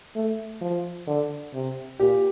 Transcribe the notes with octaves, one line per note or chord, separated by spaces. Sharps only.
A3
F3
D3
C3
A#2 G4